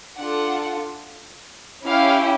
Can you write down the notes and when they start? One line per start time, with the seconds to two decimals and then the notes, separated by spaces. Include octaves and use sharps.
0.18 D4 F4 A4 F#5
1.85 C#4 E4 G4 F5